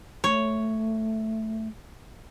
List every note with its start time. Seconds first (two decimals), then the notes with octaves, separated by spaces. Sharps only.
0.24 A3 C#5